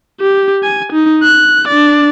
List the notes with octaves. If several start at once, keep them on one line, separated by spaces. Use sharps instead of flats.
G4
G#5
D#4
F#6
D4 D5